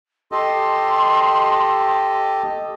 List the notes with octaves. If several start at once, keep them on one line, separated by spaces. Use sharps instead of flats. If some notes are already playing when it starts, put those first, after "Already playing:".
G4 A4 D#5 C6